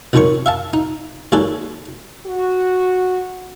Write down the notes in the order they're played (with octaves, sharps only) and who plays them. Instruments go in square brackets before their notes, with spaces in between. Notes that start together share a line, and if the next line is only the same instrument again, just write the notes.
[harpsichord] B1 F2 G#2 D#3 C#5 C#6
E5 F5 A5
D#4
D#2 G#3 A4 C#5 D5
[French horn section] F#4